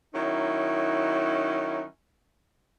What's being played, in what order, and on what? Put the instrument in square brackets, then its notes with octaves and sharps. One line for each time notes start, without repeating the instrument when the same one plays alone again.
[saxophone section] D#3 F#3 C#4 D#4 E4